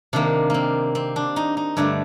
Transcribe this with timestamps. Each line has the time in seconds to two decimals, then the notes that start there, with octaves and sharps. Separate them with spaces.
0.13 C3 D#3 A#3 D4
0.50 A#3 C4
0.95 C4
1.16 D4
1.36 D#4
1.57 D#4
1.77 G2 D3 A3 D5